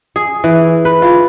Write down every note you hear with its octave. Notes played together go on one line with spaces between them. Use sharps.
G#4
E3
B4
F4